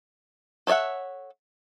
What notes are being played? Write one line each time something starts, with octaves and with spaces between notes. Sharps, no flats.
A4 C#5 D5 E5 F#5